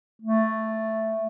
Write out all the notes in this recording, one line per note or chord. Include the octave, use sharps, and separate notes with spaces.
A3